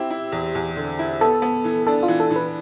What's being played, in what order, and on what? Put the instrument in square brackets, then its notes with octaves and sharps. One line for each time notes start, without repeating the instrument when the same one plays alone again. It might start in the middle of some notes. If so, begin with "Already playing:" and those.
Already playing: [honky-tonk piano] C4 E4 [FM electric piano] G4
[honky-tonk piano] E4
E2
E2
D3
E4
[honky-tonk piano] B3 [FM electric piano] A4
[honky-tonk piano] B3
E3
[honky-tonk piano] D4 [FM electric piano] A4
[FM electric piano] F4
[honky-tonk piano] E3
[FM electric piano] A4
[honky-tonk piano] E3
[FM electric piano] B4